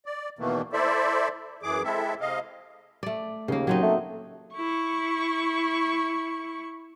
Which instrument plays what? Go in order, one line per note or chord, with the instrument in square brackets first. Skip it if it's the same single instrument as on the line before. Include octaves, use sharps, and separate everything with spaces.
[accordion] D5
E2 B2 D#3 E3 A3 A#3
E4 A4 C5 D5 E5
F#2 E3 G#4 D6
G#3 C4 E4 A4 E5
C3 D#5 F5
[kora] A3 D5
[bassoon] D#2 [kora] C#3 A#3
[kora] F#3 C4 D#4
[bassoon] A3
[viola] E4 C#6